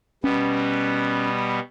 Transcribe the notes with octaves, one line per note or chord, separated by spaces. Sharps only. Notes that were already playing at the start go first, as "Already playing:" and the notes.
B2 G3 B3 C#4